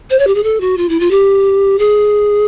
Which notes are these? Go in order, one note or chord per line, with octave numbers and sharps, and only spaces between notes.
C5
C#5
G4
G#4
A4
F#4
F4
E4
F4
G4
G#4